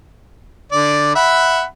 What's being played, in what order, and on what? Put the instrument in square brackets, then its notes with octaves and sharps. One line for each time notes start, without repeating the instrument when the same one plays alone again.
[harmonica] D3 D5
E5 F#5 B5